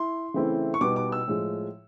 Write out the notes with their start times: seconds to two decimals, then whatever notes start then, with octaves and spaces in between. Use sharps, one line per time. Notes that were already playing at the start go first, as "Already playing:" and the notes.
Already playing: E4 C6
0.34 C#3 E3 A3 C4 E4
0.74 C#6
0.81 B2 G3 B3 D#4 D6
0.96 D6
1.12 E6
1.28 A2 F3 G#3